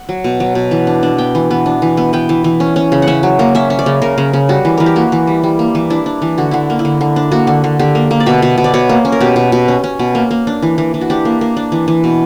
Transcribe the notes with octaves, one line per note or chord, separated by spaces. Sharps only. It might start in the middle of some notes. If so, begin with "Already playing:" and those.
Already playing: F#5
F#3
B2
F#3
B2
E3
D4
D4
B3 G5
E3
B3
D4
E3
B3
B3 G5
E3
E3
C#4
C#4
C#3
F#5
C#4 E5
F#3
A#3
C#4 E5
C#4
D5
C#3
C#3 A#4
C#3
C#3
G3 F#4
E3
E3 A#4
G4
A#3 F#4
E3
G3
G3
A#3
E3
D4 E4
D4
E3
D3 F#4
D3 E4
A#3
E4
D3
D3
D4
A#3 F#4
D3
D3
D3 G4
A#3
A#3
D5
B2 E5
B2
B2
D5
B2 C#5
A#3
C#4
A#4
B2 G4
B2
B2
C#4
C#4
B2
A#3
A#3
D4
E3
E3
E3
F#4
D4 G4
A#3
A#3
D4
E3
E3
B2